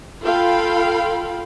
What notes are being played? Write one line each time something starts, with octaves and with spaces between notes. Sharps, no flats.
F4 A4 F5 G5 B5